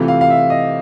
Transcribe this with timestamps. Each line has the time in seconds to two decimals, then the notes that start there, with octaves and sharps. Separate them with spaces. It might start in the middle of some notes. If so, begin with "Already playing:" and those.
Already playing: C3 E3 A3 C4 F4
0.08 F5
0.21 F5
0.30 E5
0.50 D#5